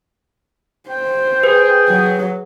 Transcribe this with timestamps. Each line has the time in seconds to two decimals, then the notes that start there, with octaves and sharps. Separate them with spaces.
0.90 C5 G5
1.43 G#4 B4
1.89 F#3